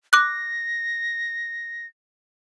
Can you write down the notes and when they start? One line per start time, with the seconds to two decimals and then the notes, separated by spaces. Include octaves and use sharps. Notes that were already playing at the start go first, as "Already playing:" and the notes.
0.13 D6 F#6 A#6